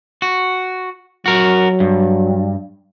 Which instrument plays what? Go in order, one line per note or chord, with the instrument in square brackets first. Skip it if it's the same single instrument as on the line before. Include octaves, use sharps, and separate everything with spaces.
[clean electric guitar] F#4
[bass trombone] F#3 [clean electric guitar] F#4 A#4
[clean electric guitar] G2